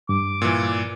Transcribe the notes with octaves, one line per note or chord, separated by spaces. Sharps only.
G2 D6
A#2 E3